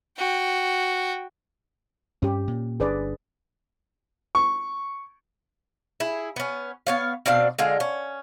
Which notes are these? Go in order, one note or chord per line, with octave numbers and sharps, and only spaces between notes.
F#4 G5
G2 C#4 G4
A#2
G1 D4 G#4 B4 D5
C#6
E4 G#4
B3 C#4
B3 C#5 F5
B2 C4 D4 F5
D3 G#3 F4
C#4